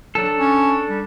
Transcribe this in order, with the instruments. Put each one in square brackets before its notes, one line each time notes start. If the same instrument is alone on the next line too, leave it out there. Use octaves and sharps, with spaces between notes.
[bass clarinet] F#3 [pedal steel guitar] D4 A4
[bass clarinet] C#4
G3